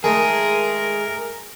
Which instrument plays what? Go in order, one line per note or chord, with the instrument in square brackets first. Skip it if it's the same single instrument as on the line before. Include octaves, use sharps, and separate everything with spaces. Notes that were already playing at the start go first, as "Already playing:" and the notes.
[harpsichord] D#3 G#3 A3 [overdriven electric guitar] G#4 [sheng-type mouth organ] A#4